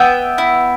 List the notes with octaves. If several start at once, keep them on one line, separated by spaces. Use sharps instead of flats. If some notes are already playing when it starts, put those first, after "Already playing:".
Already playing: B3 E5 G5
E4